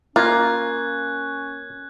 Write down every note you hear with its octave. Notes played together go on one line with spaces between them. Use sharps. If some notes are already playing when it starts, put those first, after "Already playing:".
A#3 C#4 F4 F#6 G#6